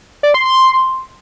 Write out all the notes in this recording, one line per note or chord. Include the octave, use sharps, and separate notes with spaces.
D5
C6
C6